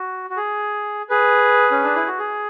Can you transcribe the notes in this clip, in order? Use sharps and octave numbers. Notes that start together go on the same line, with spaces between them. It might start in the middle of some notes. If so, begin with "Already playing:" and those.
Already playing: F#4
F#4
G#4
G#4 B4
C#4
D4
E4
F#4
G#4